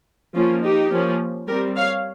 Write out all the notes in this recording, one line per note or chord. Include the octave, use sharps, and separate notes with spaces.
F3 A#3 C#4 F4
D#4 G4
F3 A#3 C#4
G3 C4 G4 A#4
C#5 F5